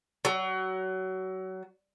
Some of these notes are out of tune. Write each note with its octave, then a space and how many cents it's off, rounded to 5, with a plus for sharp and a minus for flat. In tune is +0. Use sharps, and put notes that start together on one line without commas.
F#3 +25